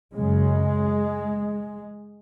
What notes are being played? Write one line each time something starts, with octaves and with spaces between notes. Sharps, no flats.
F#2 C#3 G#3